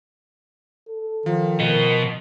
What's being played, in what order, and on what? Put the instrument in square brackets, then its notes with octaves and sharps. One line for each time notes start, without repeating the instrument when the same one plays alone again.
[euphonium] A4
[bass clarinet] D#3 [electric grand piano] F3
[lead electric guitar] B2 D#5 [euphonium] A#4